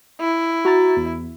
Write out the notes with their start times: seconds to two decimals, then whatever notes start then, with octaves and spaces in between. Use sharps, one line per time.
0.20 E4
0.65 F#4 A#5 A6
0.96 E2